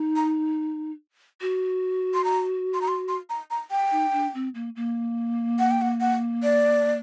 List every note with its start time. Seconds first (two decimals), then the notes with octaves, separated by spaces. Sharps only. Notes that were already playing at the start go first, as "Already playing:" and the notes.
Already playing: D#4
0.16 A#5
1.41 F#4
2.14 C6
2.24 A#5
2.74 C6
2.82 A#5
2.88 C6
3.08 C6
3.30 A#5
3.51 A#5
3.71 G5
3.91 D#4
4.13 D4
4.34 C4
4.55 A#3
4.76 A#3
5.59 F#5
5.71 G5
5.82 F#5
6.01 F#5
6.43 D5